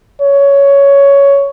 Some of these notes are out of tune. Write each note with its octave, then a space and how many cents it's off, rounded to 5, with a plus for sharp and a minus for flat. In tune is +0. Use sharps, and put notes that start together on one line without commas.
C#5 +10